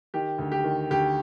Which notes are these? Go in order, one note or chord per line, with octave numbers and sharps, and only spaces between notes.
D#3 G4
D2
G4
D#3
D2 G4